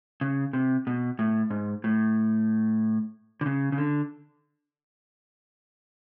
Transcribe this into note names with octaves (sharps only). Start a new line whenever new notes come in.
C#3
C3
B2
A2
G#2
A2
D3
C#3
C#3
D3